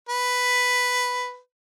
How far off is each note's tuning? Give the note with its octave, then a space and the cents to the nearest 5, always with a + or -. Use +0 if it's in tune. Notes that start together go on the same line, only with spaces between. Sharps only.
B4 +5